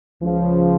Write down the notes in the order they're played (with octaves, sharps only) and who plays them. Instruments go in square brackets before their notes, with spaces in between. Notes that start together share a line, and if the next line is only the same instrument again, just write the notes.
[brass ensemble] C#2 C#3 F3